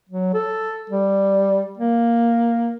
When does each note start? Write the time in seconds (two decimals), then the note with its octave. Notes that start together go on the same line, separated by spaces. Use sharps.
0.09 F#3
0.34 A4
0.90 G3
1.77 A#3